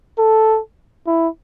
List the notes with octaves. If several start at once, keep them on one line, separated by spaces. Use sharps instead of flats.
A4
E4